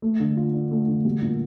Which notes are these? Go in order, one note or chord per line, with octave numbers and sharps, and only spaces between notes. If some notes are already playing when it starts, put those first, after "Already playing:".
A3
D3
F4
D4
A3
D3
G3
A#2